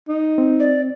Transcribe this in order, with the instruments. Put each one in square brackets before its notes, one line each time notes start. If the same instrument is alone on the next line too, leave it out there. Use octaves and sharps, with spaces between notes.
[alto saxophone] D#4
[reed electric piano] C4
[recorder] D5